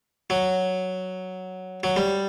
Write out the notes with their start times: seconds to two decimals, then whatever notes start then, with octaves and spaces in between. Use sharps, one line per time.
0.30 F#3
1.83 F#3
1.97 G3